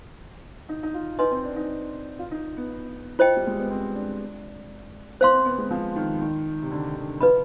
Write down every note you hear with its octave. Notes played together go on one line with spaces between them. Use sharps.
D#4
D#4
F4
D#4 B4 D#5 G#5 C6
C4
D4
D#4
F4
D#4
B3
F4 C5 D#5 G5
G3
G#3
B3
C4
D4
B3 C5 F5 C6
C4
B3
G#3
F3
D#3
D#3
C3
D3
D3
F3 B4 D#5 B5